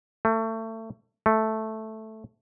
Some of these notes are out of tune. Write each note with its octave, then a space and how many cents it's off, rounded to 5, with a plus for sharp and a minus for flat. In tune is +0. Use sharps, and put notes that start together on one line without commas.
A3 +25
A3 -5